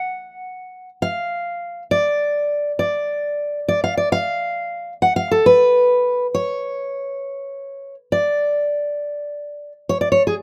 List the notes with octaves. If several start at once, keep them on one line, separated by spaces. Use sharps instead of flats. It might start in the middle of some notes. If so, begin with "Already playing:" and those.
Already playing: F#5
F5
D5
D5
D5
F5
D5
F5
F#5
F5
A4
B4
C#5
D5
C#5
D5
C#5
G#4